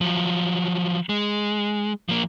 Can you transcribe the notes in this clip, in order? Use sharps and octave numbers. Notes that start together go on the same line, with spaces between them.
F3 F#3
G#3
F3 A#3